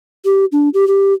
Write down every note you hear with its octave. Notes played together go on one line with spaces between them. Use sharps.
G4
D4
G4
G4